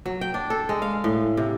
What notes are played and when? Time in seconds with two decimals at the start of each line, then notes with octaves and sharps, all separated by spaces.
0.06 F#3
0.21 G5
0.34 D4
0.50 A4
0.69 G#3
0.82 F5
1.04 A2
1.37 C3